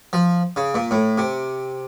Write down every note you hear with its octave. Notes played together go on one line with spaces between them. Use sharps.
F3
C#3
A#2
A2
C3